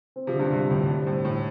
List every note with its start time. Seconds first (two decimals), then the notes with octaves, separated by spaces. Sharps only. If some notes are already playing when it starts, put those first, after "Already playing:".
0.16 C4
0.27 C3 F3
0.34 D3
0.39 G2 C3
0.52 G2 C3 G3
0.70 D2 A2
0.88 G2 G3
1.06 A2 C4
1.25 A2 C4